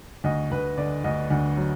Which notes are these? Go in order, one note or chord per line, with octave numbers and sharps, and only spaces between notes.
D2 D#5
D2 B4
D3 D5
D2 D#5
D2
F#3